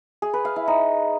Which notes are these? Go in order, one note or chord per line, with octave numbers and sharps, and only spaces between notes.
G#4
B4
F5
E4
D#4